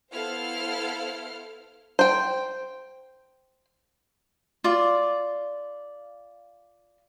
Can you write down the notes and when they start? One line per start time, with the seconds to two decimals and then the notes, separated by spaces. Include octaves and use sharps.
0.13 B3 E4 A4 C5 F5 F6
1.99 C5 G5
4.64 F4 D5